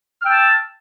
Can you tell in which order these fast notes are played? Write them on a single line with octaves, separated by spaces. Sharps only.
F6 E6 G5 A5